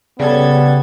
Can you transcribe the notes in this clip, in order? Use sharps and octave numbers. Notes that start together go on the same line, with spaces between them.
C#3 G3 B3 A4 G#6